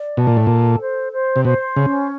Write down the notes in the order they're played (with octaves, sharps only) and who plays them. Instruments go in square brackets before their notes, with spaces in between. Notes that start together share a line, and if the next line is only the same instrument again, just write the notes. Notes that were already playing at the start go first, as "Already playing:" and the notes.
Already playing: [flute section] D5
[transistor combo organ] B2 [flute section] A5
[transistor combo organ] A#2
A2
[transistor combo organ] A#2 [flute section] A4
[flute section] C5
C5
[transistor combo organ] C3
[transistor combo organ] B2 [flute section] C5
[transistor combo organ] C#3 [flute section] C#4